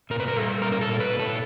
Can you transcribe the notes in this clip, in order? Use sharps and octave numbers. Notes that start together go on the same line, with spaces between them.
A#2 A#4
B4
A#4
G3 A4
A#2 A#4
A#4
A4
A#2
B4
A#2
A4